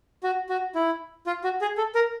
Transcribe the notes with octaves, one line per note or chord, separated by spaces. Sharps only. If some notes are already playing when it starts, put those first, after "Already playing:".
F#4
F#4
E4
F4
F#4
G#4
A4
A#4